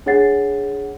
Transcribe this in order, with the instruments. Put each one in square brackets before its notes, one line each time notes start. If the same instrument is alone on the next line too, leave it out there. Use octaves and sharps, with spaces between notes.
[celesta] D4 G#4 C#5 F#5 A6 C7